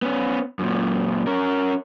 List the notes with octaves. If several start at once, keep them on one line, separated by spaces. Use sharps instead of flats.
B3 C#4
F#2 A#2
C#4 A#4